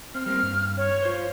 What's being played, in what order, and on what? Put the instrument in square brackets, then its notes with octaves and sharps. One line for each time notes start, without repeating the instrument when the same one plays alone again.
[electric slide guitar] C4 [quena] F6
[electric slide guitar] G3 A#3 C4 [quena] F6
[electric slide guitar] G2
[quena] C#5
[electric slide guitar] F4 C5